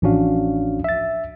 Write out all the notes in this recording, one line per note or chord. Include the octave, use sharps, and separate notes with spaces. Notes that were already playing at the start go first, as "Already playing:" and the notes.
A1 F3 C#4 D4 F#4 F5
E5 A6